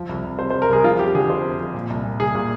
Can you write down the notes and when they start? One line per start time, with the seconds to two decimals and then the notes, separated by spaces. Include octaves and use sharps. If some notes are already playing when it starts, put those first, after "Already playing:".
Already playing: F3
0.09 C2
0.24 C2
0.38 C3 C5
0.50 C5
0.54 C3
0.62 A#4
0.69 C2 G#4
0.84 F3 F4
0.99 F2 G4
1.15 D3 G#4
1.30 F3 C5
1.44 F2
1.59 F3
1.74 A#2
1.90 C2
2.04 A#2
2.20 C2 G#4
2.35 A#2